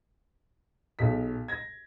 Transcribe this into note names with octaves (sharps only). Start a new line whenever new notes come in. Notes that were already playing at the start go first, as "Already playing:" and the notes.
B1 G#4 B6
G#6 A#6